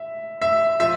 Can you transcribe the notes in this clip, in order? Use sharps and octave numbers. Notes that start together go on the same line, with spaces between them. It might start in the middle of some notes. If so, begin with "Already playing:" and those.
Already playing: E5
E5
F3 E5